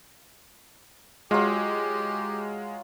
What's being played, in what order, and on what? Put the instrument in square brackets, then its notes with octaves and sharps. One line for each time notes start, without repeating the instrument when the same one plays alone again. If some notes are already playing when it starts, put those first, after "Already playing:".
[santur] F#3 F4 [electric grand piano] G#3 [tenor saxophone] G4